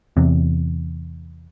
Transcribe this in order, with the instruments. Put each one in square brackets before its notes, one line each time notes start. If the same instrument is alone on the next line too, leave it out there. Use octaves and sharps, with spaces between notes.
[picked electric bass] E2 C3